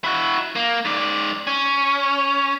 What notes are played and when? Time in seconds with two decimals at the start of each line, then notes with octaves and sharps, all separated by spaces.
0.04 E4 F#4
0.55 A#3
0.85 G#2 D5
1.47 C#4